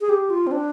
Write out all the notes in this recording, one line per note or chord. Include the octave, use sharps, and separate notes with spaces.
G#4
G4
F4
C4
D4